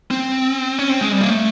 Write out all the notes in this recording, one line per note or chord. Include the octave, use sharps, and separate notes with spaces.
C4
C#4
C4
G#3
G3
A#3
A3